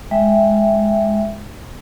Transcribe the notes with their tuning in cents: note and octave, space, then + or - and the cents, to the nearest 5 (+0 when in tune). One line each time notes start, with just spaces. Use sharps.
G#3 +0 E5 +0 G5 +0